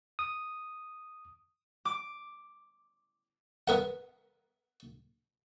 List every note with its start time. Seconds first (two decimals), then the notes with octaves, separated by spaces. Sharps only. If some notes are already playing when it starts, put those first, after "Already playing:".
0.19 D#6
1.85 D6
3.68 B3 A#4 F#5